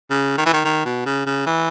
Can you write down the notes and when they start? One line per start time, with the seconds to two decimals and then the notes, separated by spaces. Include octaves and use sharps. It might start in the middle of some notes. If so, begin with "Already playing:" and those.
0.10 C#3
0.38 D#3
0.46 E3
0.53 D#3
0.65 D#3
0.85 B2
1.05 C#3
1.26 C#3
1.46 E3